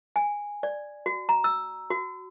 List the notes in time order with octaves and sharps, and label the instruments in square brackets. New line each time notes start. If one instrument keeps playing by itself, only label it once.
[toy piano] G#5
D5
F#4
A#5
E6
F#4